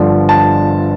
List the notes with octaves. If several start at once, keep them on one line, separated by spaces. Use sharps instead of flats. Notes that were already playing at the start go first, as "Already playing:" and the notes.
Already playing: G1 G2 D3 F3 D4
A5